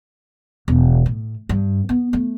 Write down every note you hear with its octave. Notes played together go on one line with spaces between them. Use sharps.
E1
A2
G2
B3
A3